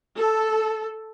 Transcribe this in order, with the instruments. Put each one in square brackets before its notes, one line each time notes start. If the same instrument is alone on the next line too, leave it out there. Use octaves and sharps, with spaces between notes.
[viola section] A4